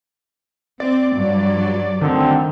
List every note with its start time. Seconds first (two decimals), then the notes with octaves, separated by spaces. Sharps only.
0.80 C4 D5
1.14 G2 F#3
2.01 D2 D3 D#3 C4